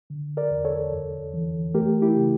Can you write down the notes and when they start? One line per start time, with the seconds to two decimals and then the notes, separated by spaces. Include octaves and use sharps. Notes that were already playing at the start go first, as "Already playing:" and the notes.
0.10 D3
0.37 A#4 D5
0.50 E2
0.65 A4 C#5
0.92 F2
1.34 E3
1.74 A3 G4 A#4
2.02 E4 G4
2.16 C#3